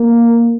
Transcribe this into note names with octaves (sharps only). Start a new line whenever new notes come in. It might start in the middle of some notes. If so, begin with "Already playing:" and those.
Already playing: A#3